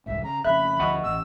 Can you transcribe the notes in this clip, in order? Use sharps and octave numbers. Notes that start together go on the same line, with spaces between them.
E1 C2 G#2 E5
C#3 A#5
F2 C#3 E5 B5 F#6
D2 D3 F3 D#5 F#5 C#6
A1 E6